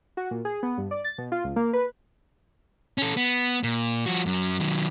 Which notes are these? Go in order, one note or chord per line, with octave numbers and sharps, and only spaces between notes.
F#4
A#2
G#4
B3
G2
D5
A6
B2
F4
C#2
A#3
B4
C#4 A4
B3
A#2
F3 F#4
F#2 F#3
D#3 F#3